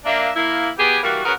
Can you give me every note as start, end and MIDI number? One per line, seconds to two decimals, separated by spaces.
0.05 0.29 58
0.05 0.29 62
0.05 0.29 76
0.36 0.68 58
0.36 0.68 64
0.78 0.98 59
0.78 0.98 67
0.78 0.98 68
1.03 1.21 52
1.03 1.21 55
1.03 1.21 58
1.03 1.21 66
1.24 1.33 61
1.24 1.33 66
1.24 1.33 68
1.24 1.33 70
1.24 1.33 71
1.24 1.33 78